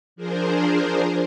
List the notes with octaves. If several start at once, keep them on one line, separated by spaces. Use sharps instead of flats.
F3 D4 G#4 A#4 C5